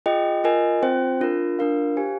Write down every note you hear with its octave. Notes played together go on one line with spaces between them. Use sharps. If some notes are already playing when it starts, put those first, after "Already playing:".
F4 G#4 D#5 G5
F4 A#4 D#5 G#5
C4 F4 C5 G5
D4 F4 A#4
D4 F4 A#4 F5
G4 C5 F5 G#5